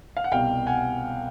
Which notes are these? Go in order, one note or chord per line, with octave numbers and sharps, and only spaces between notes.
F5
F#5
C2 B2 G3 F5 G5
F#5 G#5